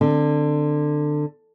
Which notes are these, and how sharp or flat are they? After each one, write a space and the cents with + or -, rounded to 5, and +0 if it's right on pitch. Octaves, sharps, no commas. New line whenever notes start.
D3 +20 C4 +0